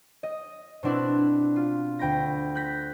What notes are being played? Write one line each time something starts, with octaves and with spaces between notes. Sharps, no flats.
D#5
B2 C4 D4 E4 F#6
F4
D2 G5 B5 A#6
F#6 G6 A#6 B6